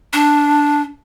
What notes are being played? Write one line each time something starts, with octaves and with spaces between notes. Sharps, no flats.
D4